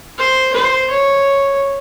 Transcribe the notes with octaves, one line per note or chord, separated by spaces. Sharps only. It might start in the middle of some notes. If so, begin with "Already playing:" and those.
C5
C5
C#5